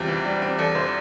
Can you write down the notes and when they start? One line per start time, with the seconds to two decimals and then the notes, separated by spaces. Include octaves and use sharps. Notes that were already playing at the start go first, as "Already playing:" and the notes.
Already playing: E2 G3 C4 F4 G4
0.08 E3
0.25 G3
0.42 C4
0.59 E2 A4
0.75 E3 C5